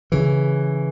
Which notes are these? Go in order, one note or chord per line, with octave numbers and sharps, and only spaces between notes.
C#3 E3